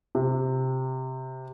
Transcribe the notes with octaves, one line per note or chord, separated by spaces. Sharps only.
C3